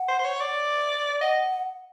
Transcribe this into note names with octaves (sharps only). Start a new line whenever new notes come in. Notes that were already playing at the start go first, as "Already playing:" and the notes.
Already playing: F#5
C5
C5
C#5
D5
D#5 F#5